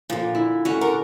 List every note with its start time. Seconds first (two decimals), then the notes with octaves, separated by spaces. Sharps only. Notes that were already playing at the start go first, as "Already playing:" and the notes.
0.10 A#2 D3 F3
0.35 E4
0.65 A3 C#4 F#4 F#5
0.81 D3 A#4 A#5